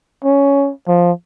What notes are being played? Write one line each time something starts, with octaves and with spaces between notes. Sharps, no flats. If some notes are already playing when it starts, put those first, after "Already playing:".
C#4
F3